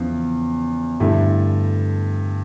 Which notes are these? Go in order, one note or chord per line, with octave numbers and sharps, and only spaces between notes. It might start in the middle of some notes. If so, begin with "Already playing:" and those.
Already playing: E2 C#3 F3
G2 D3 A3 E4